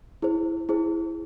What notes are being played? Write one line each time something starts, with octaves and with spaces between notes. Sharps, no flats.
E4 G#4 C5
E4 G#4 C5